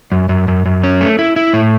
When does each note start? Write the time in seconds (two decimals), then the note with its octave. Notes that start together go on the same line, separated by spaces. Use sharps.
0.12 F#2
0.29 F#2
0.48 F#2
0.65 F#2
0.84 C#4
1.01 A3
1.19 E4
1.36 E4
1.53 A2